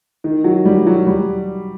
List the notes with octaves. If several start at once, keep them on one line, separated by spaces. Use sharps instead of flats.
D#3
F#3
G3
F#3
G3